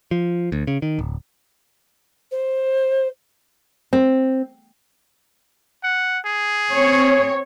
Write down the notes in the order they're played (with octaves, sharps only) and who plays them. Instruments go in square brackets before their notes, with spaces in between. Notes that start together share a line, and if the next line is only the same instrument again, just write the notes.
[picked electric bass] F3
D2
C#3
D#3
D1
[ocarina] C5
[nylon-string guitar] C4
[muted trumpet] F#5
G#4
[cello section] C4 C#5